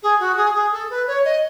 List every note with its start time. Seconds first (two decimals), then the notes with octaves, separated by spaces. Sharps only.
0.03 G#4
0.20 F#4
0.37 G#4
0.55 G#4
0.72 A4
0.90 B4
1.07 C#5
1.25 D#5